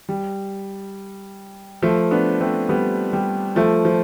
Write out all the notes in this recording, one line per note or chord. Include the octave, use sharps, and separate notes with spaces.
G3
F3 A3
B3 D4
A3 C4
G3 B3
G3
F3 A3
F3